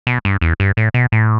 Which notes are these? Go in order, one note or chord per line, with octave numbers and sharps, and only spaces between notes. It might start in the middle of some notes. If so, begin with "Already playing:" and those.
B2
G2
E2
G2
A2
B2
A2